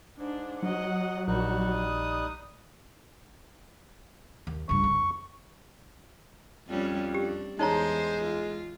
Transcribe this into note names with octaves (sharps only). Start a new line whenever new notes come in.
G#2 D4
F#3 D#5 F#5
A#1 G3 D#4 F#4 F#6
D#6
D#2
C#2 G2 C#6
F2
F2 G3 C#4
C4 D4 G4
E2 G#3 D#4 C5 C#5 A#5
F4